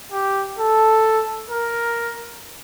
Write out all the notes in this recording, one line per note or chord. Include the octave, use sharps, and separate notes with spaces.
G4
A4
A#4